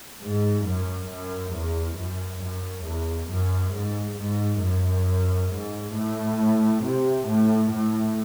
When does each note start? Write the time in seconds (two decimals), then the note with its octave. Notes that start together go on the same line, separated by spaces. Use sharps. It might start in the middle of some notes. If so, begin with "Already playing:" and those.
0.20 G#2
0.64 F#2
1.09 F#2
1.53 E2
1.96 F#2
2.40 F#2
2.85 E2
3.29 F#2
3.73 G#2
4.18 G#2
4.62 F#2
5.50 G#2
5.94 A2
6.83 C3
7.26 A2
7.71 A2